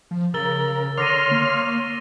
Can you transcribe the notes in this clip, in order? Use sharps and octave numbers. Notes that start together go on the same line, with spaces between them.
F3
C#3 A#4 E6 A6 G7
D3 C#5 C6 D6 F6 A#6 D#7
A#3